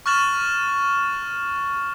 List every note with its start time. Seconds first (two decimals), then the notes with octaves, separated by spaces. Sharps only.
0.06 C#6 F6 F#6 A6 E7 F#7